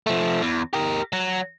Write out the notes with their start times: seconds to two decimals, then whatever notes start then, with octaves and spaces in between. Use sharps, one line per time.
0.07 F3 A3
0.42 E2
0.74 G4 A#4
1.13 F#3